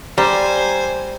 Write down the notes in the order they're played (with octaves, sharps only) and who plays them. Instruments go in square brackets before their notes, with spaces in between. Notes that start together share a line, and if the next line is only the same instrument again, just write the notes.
[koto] G3 [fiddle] C5 G#5 [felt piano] A#5